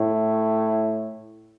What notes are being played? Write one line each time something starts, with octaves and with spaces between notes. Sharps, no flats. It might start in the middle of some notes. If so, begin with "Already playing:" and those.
Already playing: A2